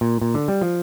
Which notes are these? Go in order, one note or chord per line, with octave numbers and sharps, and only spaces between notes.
A#2
A#2
D3
G3
F3